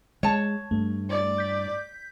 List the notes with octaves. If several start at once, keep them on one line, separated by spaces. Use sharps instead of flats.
G#3 C#5 A5
G2 A3
D5
G6 B6